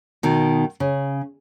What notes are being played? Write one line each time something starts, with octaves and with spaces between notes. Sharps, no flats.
B2 D#3
C#3